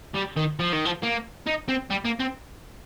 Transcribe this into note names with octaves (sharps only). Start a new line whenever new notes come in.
G3
D#3
F3
D#3
F3
A#3
D#4
C4
G3
A#3
C4